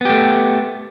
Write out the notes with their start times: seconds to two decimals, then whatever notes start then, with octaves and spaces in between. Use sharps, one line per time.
0.01 B3
0.05 G4
0.10 A3